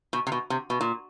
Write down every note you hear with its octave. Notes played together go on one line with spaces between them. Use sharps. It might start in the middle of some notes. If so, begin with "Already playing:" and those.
B2
C3
B2
C3
B2
A#2